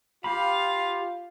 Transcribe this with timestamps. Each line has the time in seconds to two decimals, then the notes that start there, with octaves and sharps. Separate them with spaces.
0.24 F4 G4 F5 B5